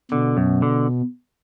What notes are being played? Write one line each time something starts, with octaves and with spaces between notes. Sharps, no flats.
B2 D3
F#2
D3